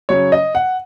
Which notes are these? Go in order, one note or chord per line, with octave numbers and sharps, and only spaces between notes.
C#3 F#3 C#5
D#5
F#5